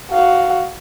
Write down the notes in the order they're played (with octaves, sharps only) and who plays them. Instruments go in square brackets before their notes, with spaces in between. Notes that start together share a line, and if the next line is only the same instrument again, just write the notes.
[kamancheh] F#4 F5